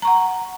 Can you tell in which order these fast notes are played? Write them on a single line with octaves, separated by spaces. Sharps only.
A#5 C#6 F#5